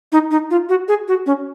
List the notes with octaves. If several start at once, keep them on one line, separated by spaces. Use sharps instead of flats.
D#4
D#4
F4
F#4
G#4
F#4
C#4